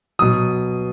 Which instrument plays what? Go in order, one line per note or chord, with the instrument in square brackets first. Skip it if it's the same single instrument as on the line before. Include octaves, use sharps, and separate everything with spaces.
[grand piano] B2 F#3 D#6